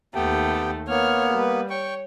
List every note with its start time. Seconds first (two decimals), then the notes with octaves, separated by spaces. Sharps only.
0.15 D#2 A3 B3 G4 G5
0.88 A#3 B3 C#5 F6
1.35 G3 B4
1.70 C#5 G5 C#6